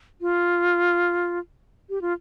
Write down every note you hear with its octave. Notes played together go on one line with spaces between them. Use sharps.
F4
G4
F4